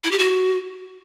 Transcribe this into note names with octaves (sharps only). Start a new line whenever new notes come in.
E4
G4
F#4